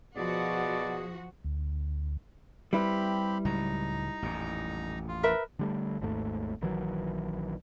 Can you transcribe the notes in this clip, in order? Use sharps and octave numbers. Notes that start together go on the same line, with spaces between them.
B2 F3 F#4 G#4 D5
D2
G3 C4 E4 G4 B4 B5
C#2 A2 F#3 D#4 A#5
A1 F2 A#2
F4
A#4 B4 E5
D3 G3 A3
G#1 D#2 G#2 A3
A#1 D#3 E3 F#3